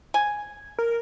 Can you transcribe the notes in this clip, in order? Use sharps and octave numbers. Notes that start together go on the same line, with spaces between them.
G#5
A#4